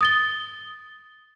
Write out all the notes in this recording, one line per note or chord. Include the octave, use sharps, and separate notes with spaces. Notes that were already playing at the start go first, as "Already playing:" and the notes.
D#6 A6 G7